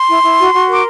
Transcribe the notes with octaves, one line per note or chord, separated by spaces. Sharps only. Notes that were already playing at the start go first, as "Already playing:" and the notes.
Already playing: C6
E4
E4
F#4
F#4
A#4 D6